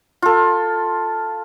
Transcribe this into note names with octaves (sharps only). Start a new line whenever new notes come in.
F4 A4